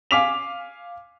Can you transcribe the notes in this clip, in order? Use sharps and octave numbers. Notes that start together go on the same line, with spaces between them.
F5 G#5 D6 B6 F7